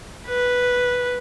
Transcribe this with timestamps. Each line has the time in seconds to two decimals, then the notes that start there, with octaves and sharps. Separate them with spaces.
0.28 B4